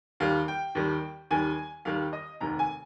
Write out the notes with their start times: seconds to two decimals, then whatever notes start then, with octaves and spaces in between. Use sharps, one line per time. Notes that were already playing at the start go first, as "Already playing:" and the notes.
0.20 D#2 D#3 G3 F5
0.48 G5
0.75 D#2 D#3 G3
1.31 D#2 D#3 G3 G#5
1.85 D#2 D#3 G3 F5
2.13 D#5
2.41 F1 D#2 D#3 A#5
2.59 G#5